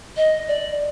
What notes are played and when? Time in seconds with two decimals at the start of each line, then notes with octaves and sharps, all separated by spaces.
0.17 D#5
0.48 D5